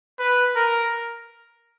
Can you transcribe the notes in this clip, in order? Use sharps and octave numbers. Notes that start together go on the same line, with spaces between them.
B4
A#4